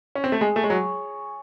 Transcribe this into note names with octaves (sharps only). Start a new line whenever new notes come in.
C#4
C4
A3
G#3 G#4
A3
G#3 C#5
F#3